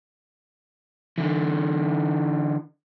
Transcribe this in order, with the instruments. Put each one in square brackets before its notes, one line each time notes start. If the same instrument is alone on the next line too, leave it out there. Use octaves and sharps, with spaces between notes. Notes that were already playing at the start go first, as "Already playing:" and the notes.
[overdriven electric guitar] D3 E3